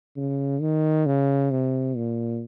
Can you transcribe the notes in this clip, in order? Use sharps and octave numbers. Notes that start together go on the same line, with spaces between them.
C#3
D#3
C#3
C3
A#2